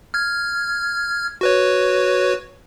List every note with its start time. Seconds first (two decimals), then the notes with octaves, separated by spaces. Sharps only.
0.14 F6 G#6
1.41 F#4 B4 C#5